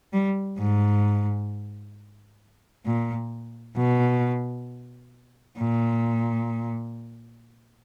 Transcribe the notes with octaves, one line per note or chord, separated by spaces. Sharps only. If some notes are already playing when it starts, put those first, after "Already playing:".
G3
G#2
A#2
B2
A#2